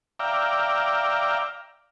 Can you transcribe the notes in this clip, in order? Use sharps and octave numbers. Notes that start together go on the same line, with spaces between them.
D5 E5 F5 G5 A#5